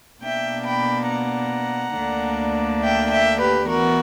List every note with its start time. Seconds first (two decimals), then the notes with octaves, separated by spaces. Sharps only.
0.23 B2 A#3 D4 E5 G5
0.66 G5 B5
1.10 F#5 A#5
1.97 D2 D3 A#3 D4
2.82 E5 G5
3.11 E5 G5
3.41 G4 B4
3.69 E3 B3 F#4 A#4